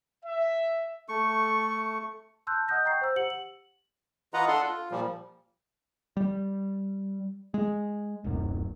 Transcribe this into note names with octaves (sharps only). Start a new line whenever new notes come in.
E5
A3 C#6
A5 C6 E6 F#6 G6
D#5 F#5 D#6 F#6 G6 A#6
G5 A#5 C#6 G6 C7
C5 E6
G4 F#5 C#7 F#7
F#7
E3 F4 B4 D#5 F#5 A#5
D4 A4 F#5 C6
F4
A#2 F3 G3
G3
G#3
D1 B1 F#2